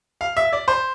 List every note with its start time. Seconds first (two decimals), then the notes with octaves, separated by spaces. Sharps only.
0.21 F5
0.37 E5
0.53 D5
0.68 C5